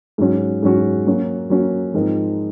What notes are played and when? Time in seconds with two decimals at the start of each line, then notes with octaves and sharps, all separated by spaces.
0.18 G#2 F#3 C#4 F#4
0.63 G#2 F#3 C#4 F#4
1.07 F#3 A#3 C#4 F#4
1.50 F#3 A#3 C#4 F#4
1.94 G#2 F3 C4 D#4 A#4